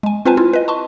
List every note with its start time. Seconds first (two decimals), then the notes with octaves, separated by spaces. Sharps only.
0.03 G#3 G#5
0.25 C4 F4 B4 C5 G#5 A5
0.37 E4 F4
0.53 B4 D#5
0.68 A5 C6 C#6